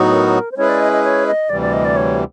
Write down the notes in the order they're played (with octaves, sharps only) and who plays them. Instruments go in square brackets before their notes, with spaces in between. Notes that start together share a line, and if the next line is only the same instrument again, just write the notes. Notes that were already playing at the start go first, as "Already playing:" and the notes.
Already playing: [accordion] A2 F#3 B3 D#4 F#4
[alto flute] A#4
C5
[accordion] G#3 C#4 E4 G#4 B4 [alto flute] C#5
[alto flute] D5
D#5
D#5
C#5
D#5
[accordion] D2 C3 E3 G3 [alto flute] D5
[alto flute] D5
D#5
D5
C#5